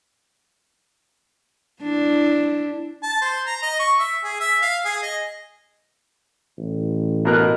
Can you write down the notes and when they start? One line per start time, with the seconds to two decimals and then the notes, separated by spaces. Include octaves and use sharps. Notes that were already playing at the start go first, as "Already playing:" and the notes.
1.83 D4 E4
3.03 A5
3.21 C5
3.46 A#5
3.63 D#5
3.80 C#6
3.99 E5
4.24 G#4
4.40 E5
4.62 F5
4.85 G#4
5.03 D#5
6.58 A1
7.25 B2 A#4 F#6